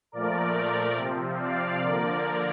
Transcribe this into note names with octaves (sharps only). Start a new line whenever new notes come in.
A#2 F3 A3 A#4 D5
A#4 D5
C3 F3 C4
D5 F5
D3 F3 A#3 A#4 D5